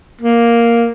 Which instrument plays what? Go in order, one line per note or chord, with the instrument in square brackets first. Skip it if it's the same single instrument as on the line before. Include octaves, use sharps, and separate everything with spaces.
[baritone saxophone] A#3